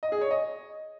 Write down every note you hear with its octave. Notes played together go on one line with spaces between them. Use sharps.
D#5
G#4
C#5
D#5